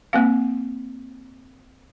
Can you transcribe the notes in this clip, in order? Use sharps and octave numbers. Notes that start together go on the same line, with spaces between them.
A#3 C4 F5